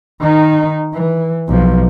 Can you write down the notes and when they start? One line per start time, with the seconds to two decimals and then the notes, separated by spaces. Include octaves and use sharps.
0.20 D#3 D#4
0.94 E3
1.48 B1 F3